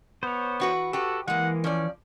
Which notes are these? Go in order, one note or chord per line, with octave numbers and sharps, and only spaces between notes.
B3 C5 C#5
E3 F#4 B4
F#4 G4 A4 B4
E3 G#3 A#3 F#5
F3 C#4 D5